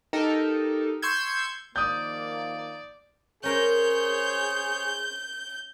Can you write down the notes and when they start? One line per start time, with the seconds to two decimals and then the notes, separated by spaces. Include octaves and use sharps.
0.13 D#4 G4 A4 A#4
1.02 C6 C#6 E6 G6 G#6
1.76 D#3 F3 A#3 D5 D#6 G6
3.43 C#4 G#4 A#4 C5 C#5 G6